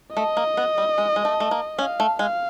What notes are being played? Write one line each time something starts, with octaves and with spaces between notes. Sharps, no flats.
A3 D#5
A#3
B3
G3
G#3
G#3
A3
A3
A#3
C#4 F5
A3
G#3 F5